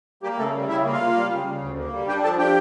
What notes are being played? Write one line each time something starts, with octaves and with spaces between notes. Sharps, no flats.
G3 A#3 G4
C#3 A3 A4
G3
C#3 E4 E5
A#3
F4 F5
A#3
G3
C#3
C#3
D2
A#3
G3
D4 G4 G5
F3 A4 A5
D4 G4 G5